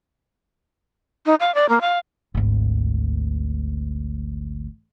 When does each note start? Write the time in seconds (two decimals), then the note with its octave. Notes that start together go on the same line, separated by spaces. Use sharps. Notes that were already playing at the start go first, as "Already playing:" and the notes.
1.26 D#4
1.40 F5
1.55 D5
1.69 A#3
1.81 F5
2.35 G#1 D2